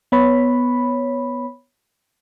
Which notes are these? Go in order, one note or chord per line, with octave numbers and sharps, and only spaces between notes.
B3 C#5 B5